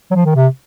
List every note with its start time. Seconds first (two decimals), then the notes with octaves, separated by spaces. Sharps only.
0.11 F#3
0.15 F3
0.25 D#3
0.36 C3